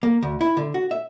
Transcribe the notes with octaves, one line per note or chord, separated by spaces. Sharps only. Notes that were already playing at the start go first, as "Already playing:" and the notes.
A#3
D2
E4
D3
F#4
E5